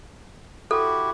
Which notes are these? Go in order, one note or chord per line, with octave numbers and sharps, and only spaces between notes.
E4 F#4 G4 A4